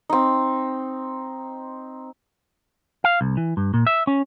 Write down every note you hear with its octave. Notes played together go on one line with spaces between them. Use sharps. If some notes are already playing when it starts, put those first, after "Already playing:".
C4 D#4
F5
C2
E3
G2
A#2
E5
C#4